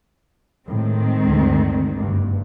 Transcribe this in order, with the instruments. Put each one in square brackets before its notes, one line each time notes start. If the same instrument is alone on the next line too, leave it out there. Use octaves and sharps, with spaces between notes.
[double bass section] A2 [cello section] D#3 G#3 C4
[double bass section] D2 G2
F#1 G2